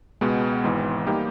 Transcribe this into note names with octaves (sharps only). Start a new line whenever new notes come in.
C#2 B2 G#3 B3
G#1 G#2 E3
G3 A#3 D#4 G4